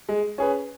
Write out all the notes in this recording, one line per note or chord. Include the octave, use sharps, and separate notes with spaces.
G#3
C#4 G#4 B4